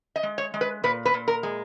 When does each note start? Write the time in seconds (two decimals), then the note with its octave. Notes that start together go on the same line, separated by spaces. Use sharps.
0.16 D#5
0.23 G#3
0.38 C#5
0.54 G#3
0.61 B4
0.84 A#2 B4
1.05 B4
1.14 A#2
1.28 A#4
1.43 G#3